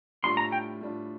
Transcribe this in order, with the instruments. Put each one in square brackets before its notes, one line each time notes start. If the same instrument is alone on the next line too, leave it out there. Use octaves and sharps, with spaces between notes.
[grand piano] A2 G3 D4 F4 [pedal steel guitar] C6
[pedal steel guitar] A#5
G5
[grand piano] A2 G3 D4 F4